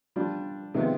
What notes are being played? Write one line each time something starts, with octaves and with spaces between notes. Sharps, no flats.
G3 D4 F4
C3 D#3 G#3 B3 F4